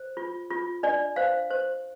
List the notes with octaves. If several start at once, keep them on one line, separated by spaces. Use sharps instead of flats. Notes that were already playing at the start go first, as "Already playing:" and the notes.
Already playing: C5
F4
F4
D4 D5
C5 F5
C5